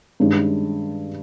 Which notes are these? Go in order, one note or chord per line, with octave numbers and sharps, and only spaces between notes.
G2 D#3 G#3 C#4